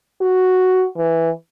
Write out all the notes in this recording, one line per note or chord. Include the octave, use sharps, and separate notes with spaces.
F#4
E3